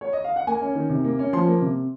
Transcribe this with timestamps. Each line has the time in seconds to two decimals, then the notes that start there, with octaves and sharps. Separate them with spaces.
0.01 C#5
0.13 D#5
0.24 F5
0.36 F#5
0.47 A#3 G#5
0.61 C#4
0.75 D#3
0.90 C3
1.04 A#3
1.19 C#4
1.33 F3 C6
1.47 A#3
1.61 C3